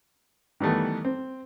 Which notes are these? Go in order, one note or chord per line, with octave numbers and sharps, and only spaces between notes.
D#3 E3 G3 A3 B3
C4